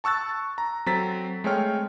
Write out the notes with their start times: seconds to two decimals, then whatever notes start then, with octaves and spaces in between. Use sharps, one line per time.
0.04 A5 C#6 E6 F#6 A6
0.58 A#5
0.86 F#3 C4 A4 A#5 A6 B6
1.44 G#3 A3 C4 C#5 G5 F6